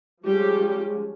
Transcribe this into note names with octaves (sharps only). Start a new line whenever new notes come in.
F3 G3 G#3 C#4 G4